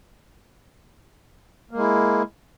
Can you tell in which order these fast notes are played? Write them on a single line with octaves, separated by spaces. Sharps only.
A#3 G#3 E4